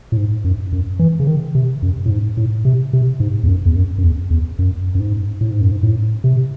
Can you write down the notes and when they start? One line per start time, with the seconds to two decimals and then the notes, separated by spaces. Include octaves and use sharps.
0.12 A2
0.17 G#2
0.44 F#2
0.72 F#2
0.99 E3
1.20 C#3
1.27 D#3
1.55 C3
1.82 F#2
2.06 A2
2.10 G#2
2.37 A2
2.65 C3
2.93 C3
3.20 G#2
3.43 E2
3.48 F#2
3.66 E2
3.76 F#2
3.98 F#2
4.03 E2
4.31 E2
4.59 F#2
4.95 F#2
5.00 G#2
5.41 A2
5.51 G#2
5.61 F#2
5.71 G#2
5.83 A2
6.24 C3